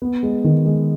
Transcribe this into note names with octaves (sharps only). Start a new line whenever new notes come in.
B3
G#3
D#3
G#3